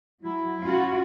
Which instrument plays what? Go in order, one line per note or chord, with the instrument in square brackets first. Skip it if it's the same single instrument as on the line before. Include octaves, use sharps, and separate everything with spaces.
[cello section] F#3 [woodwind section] E4
[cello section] C#4 F4 F#4